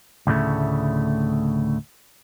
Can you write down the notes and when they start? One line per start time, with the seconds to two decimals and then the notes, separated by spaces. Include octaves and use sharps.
0.27 D2 A2 C#3 A3